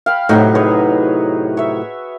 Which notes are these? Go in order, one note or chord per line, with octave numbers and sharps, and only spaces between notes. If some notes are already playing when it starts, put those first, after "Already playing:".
F5 G5 B5
A2 C3 F#3 D#4 F#4 D#5
G#4 B4 C#5
C#5 E5